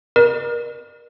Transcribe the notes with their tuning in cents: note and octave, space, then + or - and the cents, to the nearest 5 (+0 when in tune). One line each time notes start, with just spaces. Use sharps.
A#4 +30 D5 +40